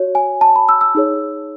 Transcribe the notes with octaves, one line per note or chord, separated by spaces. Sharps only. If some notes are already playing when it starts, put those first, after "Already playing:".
Already playing: F#4 C#5
G#5
A5
B5
E6
E6
D#4 G#4 C#5